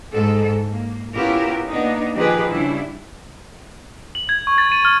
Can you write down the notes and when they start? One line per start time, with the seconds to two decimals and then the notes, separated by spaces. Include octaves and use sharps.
0.14 G#2 A4
0.69 A#3
1.14 B3 C#4 E4 F4 G4 A#4
1.70 A#3 B3 D4 D#4
2.15 D#3 F3 G4 G#4 B4
2.50 C#3 G3 D4 E4
4.15 F#7
4.29 G#6
4.47 C#6
4.58 A6
4.72 D#7
4.85 F6